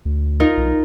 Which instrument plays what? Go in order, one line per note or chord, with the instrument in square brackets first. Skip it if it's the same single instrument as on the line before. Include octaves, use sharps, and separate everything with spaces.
[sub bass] D2
[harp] D#4 F4 A#4
[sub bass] B1